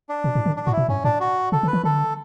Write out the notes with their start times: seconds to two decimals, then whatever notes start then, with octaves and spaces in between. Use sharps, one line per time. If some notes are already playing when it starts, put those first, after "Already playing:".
0.09 D4
0.24 B2
0.35 A2
0.46 D3
0.57 D4
0.66 A2 F#4
0.72 B2 E4
0.89 G2 C#4
1.04 A2 D4
1.20 F#4
1.52 C#3 A4
1.63 D3
1.68 B4
1.73 E3
1.84 D3 A4